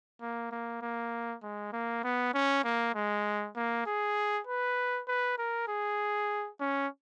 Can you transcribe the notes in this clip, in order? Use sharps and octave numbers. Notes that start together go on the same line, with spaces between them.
A#3
A#3
A#3
G#3
A#3
B3
C#4
A#3
G#3
A#3
G#4
B4
B4
A#4
G#4
C#4